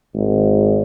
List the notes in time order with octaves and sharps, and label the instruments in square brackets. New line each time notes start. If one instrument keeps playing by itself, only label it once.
[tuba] G#1